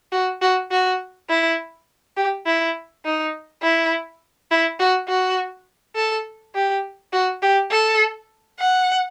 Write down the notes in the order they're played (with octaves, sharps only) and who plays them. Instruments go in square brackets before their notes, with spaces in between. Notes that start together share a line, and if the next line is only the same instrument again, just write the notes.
[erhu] F#4
F#4
F#4
E4
G4
E4
D#4
E4
E4
F#4
F#4
A4
G4
F#4
G4
A4
F#5